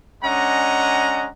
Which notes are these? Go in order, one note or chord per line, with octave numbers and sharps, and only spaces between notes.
G#3 C#4 D4 D#5 F#5 A#5